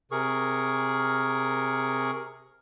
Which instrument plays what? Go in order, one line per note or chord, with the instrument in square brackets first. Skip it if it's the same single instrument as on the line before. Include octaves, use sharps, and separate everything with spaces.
[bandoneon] C3 G#4 A#4 C#6